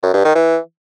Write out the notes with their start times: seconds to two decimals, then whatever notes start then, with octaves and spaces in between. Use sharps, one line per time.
0.03 F#2
0.14 G2
0.24 D#3
0.35 E3